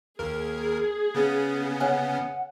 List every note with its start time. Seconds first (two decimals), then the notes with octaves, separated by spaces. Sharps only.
0.19 D#2 G#4 A#4
1.15 C#3 B3 C#4
1.80 C#5 F#5 G#5 F6